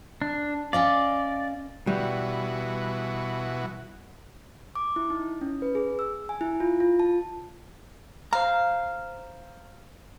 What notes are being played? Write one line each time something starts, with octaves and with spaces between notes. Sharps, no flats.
D4
C#4 D5 D#5 F5
B2 E3 G3 F#4
D6
E4
D#4
C#4
B4
G#4
E6
G#5
E4
F4
F4
A5
C5 F5 A#5